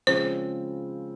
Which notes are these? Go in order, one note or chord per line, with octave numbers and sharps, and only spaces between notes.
C#3 F3 G#3 C4 C5